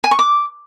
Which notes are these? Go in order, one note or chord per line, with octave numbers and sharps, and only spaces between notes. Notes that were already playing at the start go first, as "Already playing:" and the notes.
G#5
C#6
D6